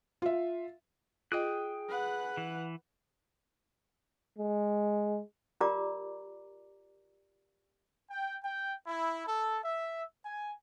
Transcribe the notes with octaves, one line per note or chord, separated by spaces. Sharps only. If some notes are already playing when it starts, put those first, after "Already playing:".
F4 E5
F4 G#4 D#5 G5 D#6 F#6
B4 F#5
E3
G#3
F4 G4 A#4 D5 A#5 D6
G5
G5
E4
A4
E5
G#5